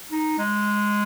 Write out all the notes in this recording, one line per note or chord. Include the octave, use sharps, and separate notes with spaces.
D#4
G#3